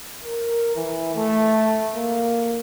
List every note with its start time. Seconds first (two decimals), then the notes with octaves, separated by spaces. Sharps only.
0.24 A#4
0.76 E3
1.16 A3
1.96 A#3